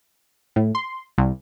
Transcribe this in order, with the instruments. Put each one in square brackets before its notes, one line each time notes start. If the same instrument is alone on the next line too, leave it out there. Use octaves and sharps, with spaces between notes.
[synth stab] A2
C6
C2